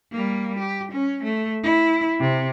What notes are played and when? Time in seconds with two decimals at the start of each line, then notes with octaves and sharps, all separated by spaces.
0.11 G3 A#3
0.59 G4
0.92 C#4
1.24 A3
1.63 E4
2.20 C3